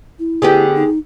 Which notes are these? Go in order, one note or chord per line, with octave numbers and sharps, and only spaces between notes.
E4
D3 B3 G4 G#4
D#4